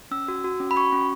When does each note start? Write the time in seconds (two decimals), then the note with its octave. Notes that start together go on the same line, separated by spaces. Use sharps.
0.11 C#4 E6
0.28 F#4
0.44 F#4
0.60 C#4
0.71 B5
0.76 F#4 C#6
0.93 C#4